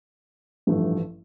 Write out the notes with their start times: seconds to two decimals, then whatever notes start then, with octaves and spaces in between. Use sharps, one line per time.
0.67 A1 G2 F3 A3